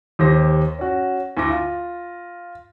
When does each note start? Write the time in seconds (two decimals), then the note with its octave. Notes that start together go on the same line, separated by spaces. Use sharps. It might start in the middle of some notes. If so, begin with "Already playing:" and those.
0.19 D#2 G4 C5 A#6
0.79 C#4 F#4
1.37 D2 E4 D6 A#6
1.50 F4